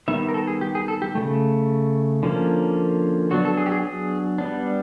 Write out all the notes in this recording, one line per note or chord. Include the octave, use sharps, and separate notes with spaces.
D#3 G3 B3 E5
A#4
A4
G#4
G4
G#4
A4
G4
C#3 F#3 A3
D3 F3 A#3 C#4
F#3 B3 D4 F#4
A4
G#4
G4
G#4
G#4
G3 B3 D4